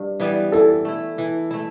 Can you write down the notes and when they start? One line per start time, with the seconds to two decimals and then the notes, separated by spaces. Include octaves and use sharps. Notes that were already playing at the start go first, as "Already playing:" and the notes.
Already playing: G2
0.20 E3 G3 B3
0.52 E3 A4
0.85 A3 E4
1.18 E3
1.51 A3 E4